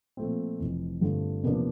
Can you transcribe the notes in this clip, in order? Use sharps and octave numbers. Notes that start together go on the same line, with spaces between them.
A#2 F3 A3 C4
F1 F2 E3
G2 D3 A3 C4 F4
E2 C3 F3 A#3 D4